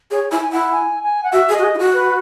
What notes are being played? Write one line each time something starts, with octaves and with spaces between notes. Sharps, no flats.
G#4 C#5
E4 G#5
G#5
E4 F#5
G#5
G#5
F#5
F#4 E5
G#4
D#5
F#4
G#4
E4
F#4
B4